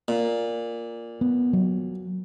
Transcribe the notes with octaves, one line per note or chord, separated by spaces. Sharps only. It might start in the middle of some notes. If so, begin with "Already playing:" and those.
A#2
B3
F#3